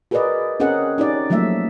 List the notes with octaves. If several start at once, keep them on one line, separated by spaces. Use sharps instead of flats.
F#4 G#4 A#4 B4 D5 D#5
C4 C#4 G#4 A#4 D#5 F#5
C#4 D#4 G4 D5
F3 F#3 A3 A#3 E5